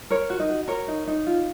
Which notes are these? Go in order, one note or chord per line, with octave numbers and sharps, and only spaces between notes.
A#4 C#5
F#4
D#4 D#5
F#4
A#4 C#5
D#4
D#4
F4